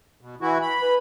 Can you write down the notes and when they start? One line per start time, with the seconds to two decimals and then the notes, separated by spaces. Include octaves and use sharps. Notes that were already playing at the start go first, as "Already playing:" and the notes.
0.21 B2
0.41 E3 E4 F#4
0.62 B5
0.81 B4